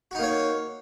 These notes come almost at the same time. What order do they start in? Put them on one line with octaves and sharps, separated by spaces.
F#4 D#4 A#3 C#5